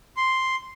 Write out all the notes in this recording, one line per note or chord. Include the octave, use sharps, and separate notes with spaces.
C6